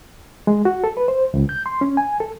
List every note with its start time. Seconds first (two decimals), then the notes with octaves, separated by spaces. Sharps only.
0.47 G#3
0.65 F#4
0.84 A4
0.97 B4
1.08 C5
1.34 C#2
1.49 G6
1.66 C6
1.81 C#4
1.97 G#5
2.20 A4